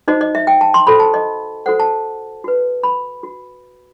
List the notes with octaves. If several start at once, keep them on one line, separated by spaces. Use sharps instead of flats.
D#4 F#4 C5 D#5
D#5
E5
G5
A5
C6
F#4 A4 C5 B5
A5
D#5
F#4 A4 C5 F#5
A5
F#4 B4
B5
F#4